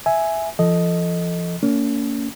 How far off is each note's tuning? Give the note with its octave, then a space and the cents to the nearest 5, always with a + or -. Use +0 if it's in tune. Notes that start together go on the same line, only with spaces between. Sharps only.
E5 +0 G#5 +5
F3 -35 A4 +0 D#5 +0
A#3 -25 C#4 +35